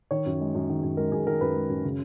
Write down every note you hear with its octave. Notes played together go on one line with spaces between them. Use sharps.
D#3 C#5
F#2
G#3
F#2
D#3
F#2
G#3 A#4
F#2 G#4
D#3 A#4
F#2 B4
G#3
F#2
C#3